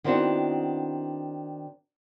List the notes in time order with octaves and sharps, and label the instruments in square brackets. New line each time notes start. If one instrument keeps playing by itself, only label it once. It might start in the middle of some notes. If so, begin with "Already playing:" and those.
[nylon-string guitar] D#3 B3 C4 D4 E4 F#4